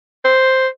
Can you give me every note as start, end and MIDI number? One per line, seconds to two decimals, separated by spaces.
0.25 0.68 72